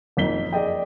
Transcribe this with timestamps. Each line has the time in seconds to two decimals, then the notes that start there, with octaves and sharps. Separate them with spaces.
0.17 F#1 F2 D#4 B6 G7
0.52 G#4 D5 D#5 G5